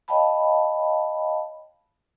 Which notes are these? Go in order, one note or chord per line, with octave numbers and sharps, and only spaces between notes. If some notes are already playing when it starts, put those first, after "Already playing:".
C#5 D#5 F5 G5 A5 B5